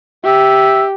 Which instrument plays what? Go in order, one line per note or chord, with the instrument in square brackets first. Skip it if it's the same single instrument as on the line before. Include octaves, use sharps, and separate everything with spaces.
[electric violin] G4 [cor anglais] E5